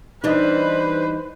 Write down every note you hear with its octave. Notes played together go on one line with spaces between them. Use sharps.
E3 G3 D4 D#4 B4 C5 D#5